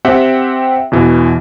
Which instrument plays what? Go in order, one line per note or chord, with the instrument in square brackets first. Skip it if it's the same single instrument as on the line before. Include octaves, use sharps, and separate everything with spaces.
[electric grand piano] C4 G4 E5 F#5 G5
E2 B2 E3